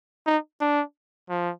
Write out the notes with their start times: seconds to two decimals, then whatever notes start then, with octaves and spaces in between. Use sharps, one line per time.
0.27 D#4
0.61 D4
1.29 F3